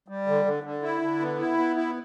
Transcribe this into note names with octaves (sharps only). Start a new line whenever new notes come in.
G3
D3
D3
D3
E4
D3
B3
E4
B3
E4